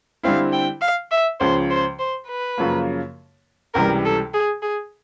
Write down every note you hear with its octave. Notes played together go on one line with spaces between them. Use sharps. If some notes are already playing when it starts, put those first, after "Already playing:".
D3 G3 C4 E4 F5
G5
F5
E5
C#2 C#3 F3 C5
C5
C5
B4
F#2 C#3 F3 A#3
C#2 C3 E3 G3 A#4
A4
G#4
G#4